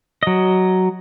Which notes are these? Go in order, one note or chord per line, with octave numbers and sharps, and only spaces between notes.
F#3 D#5